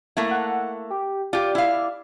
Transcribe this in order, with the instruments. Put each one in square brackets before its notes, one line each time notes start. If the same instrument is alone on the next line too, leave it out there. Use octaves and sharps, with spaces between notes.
[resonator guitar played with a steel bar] A3 A#3 E4
[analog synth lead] F#5
G4
[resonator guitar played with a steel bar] F4 G4 [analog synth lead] D5
[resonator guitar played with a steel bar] E4 F5